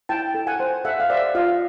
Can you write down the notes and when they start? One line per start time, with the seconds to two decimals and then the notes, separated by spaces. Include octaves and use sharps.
0.09 E4 G5 A5
0.35 A4
0.47 F#5 G#5
0.60 C5
0.85 A4 E5 F#5
1.00 F5
1.10 C5 D5 E5
1.35 F4 D#5 F5